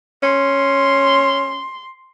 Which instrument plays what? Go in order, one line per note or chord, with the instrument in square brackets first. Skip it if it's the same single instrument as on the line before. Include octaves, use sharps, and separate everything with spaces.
[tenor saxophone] C#4 [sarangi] C6